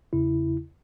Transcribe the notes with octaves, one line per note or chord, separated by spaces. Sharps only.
E2 C#3 E4